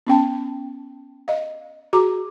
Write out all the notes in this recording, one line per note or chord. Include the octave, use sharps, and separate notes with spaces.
B3 C#4 G5 A5
D#5 F5
F#4 G#4 A#5 D6